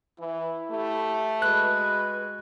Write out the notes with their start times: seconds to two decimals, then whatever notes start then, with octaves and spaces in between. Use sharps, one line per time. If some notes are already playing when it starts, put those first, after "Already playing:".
0.20 E3 E4
0.71 A3 G4
1.42 G#3 F#4 B4 F#6